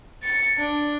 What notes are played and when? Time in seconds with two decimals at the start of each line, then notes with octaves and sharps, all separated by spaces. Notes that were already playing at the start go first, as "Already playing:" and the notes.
0.23 A6 C#7
0.58 D4